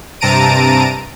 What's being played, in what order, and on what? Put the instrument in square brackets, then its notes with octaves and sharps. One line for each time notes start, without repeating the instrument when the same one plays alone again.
[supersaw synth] G2 C3 A5 A#5 D7 D#7